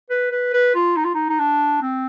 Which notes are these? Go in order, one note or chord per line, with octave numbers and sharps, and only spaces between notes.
B4
B4
B4
F4
D#4
F4
D#4
D#4
D4
C4